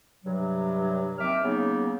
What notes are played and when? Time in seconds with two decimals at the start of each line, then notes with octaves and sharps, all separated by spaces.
0.25 G2 C3 F#3
1.19 D#2 C4 E5 D6 F6
1.44 C#3 F#3 A#3 B3 D#4